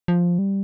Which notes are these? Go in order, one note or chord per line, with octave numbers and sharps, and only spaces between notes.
F3
G3